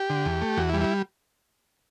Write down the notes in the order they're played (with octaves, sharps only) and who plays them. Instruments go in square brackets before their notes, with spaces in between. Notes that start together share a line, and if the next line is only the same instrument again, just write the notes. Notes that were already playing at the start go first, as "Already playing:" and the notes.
Already playing: [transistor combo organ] G4
D3
E2
A3
E2 F#4
E4
G3
E4